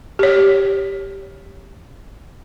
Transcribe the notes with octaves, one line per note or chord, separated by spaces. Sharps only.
G4 C#5